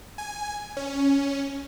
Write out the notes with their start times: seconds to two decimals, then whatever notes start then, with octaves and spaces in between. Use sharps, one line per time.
0.18 G#5
0.77 C#4